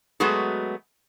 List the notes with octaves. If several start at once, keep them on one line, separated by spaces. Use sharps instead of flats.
F#3 G#3 A3 B3 F#4 G#4